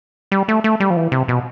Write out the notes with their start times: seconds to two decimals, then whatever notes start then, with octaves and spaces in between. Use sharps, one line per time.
0.32 G3
0.48 A3
0.64 A3
0.80 G3
0.90 F3
0.97 E3
1.12 C3
1.28 B2